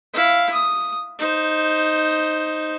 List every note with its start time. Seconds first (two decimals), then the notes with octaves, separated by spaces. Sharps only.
0.13 E4 F5
0.52 D#6
1.19 D#4 C5